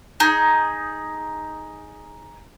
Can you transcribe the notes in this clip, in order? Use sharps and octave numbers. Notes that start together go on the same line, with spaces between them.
D#4 G#4